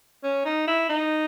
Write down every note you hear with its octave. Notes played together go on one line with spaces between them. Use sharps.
C#4
D#4
E4
D#4